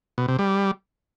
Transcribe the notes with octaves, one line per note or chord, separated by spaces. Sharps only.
B2
C3
G3